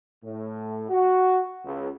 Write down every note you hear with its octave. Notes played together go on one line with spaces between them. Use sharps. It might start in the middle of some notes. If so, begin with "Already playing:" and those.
A2
F#4
C#2